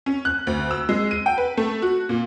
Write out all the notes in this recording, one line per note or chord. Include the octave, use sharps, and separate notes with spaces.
C#4
F#6
D2
E6
G#3
D#7
G5
B4
A3
F#4
A#2